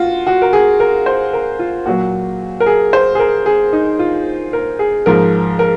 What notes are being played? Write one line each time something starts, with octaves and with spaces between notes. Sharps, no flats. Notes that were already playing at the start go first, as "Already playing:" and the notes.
Already playing: F4 F#4
F#4
A#4
G#4
A#4
C5
A#4
F4
A#2 F#3 F#4
A#4
G#4
C5
G#4
A#4
G#4
D#4
F4
A#4
G#4
G#2 F3 A#4
A#4